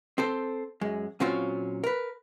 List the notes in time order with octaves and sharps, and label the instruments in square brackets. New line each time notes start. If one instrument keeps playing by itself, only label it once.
[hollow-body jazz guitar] C4 A4 C5
F#2 G#3
A#2 F#3 C4 C#4 F4 F#4
A#4 B4